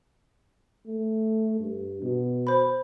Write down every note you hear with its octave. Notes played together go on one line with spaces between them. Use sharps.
A3
G2
B2
C5 B5